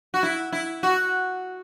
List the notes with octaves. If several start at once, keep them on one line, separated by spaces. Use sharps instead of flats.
F#4
E4
E4
F#4